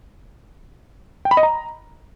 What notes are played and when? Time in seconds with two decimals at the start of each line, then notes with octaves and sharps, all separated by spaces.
1.25 G5
1.31 B5
1.37 D#5
1.43 A#5